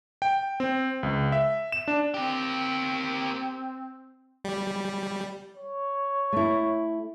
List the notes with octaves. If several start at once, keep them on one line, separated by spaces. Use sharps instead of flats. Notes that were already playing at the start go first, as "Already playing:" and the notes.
G5
C4
C#2
E5
E7
D4
A#3 C4 G4
G3
C#5
A3 E4